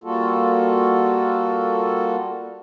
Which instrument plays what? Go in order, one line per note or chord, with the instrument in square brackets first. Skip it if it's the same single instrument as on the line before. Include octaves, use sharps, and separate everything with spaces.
[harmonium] G3 A#3 F4 F#4 A4